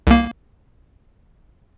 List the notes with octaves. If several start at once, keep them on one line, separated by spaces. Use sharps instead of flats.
C2 A#3